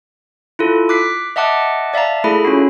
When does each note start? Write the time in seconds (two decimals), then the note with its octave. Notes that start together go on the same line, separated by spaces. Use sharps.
0.59 E4 F4 A4
0.89 D6 F#6 B6 C7
1.36 D#5 E5 F#5 A5 D6 F#6
1.94 D5 E5 F5 A5 A#5
2.24 A3 E4 G#4 A4 B5
2.45 C#4 F4 F#4